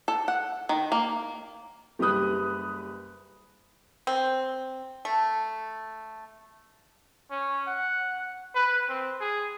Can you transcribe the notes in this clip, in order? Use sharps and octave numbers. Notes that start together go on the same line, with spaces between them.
A4
F#5
D#3
A#3
F#1 G3 G4 B4 D#6 F#6
C4
A3
C#4
F#5
B4
C4
G#4